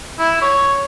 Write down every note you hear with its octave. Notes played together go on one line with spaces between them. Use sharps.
E4
C#5